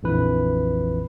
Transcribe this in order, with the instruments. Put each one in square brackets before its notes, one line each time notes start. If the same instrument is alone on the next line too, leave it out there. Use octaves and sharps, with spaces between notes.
[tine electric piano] A#1 F2 E3 B4